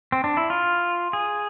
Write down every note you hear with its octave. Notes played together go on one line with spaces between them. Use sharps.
C4
D4
E4
F4
G#4